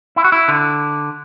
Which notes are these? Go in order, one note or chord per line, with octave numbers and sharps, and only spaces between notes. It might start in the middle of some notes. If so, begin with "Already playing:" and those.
E4
F#4
E4
D3